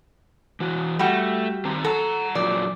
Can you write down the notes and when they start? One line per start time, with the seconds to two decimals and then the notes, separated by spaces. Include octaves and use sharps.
0.60 E3 F#4
0.99 G3 A3 F#4
1.65 D#3 C4 A#5
1.85 A4 F#5 A#5
2.35 A#2 F3 F#3 D5